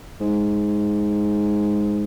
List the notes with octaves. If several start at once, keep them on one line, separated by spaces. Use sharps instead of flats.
G#2